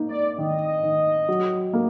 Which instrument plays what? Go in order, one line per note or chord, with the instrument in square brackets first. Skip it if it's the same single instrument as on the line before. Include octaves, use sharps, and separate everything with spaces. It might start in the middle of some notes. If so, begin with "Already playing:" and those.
Already playing: [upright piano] A#3 D#4
[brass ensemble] D5
[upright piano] D#3 [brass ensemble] D#5
[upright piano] D#3
F#3
A#3